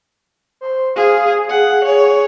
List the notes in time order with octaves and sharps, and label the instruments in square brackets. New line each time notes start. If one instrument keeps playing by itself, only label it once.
[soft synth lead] C5
[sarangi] G#4 [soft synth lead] F5
[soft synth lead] G#4 [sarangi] F#5
[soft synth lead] G#4 [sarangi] C#5